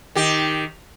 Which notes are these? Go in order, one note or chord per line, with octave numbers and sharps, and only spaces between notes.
D#3 G4